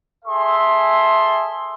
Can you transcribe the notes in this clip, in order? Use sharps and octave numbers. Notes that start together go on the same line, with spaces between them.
G#4 A4 E5 C6